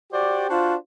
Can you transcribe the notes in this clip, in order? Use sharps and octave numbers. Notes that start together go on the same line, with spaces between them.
F#4 G4 C5 D5
D4 F4 F#4 C5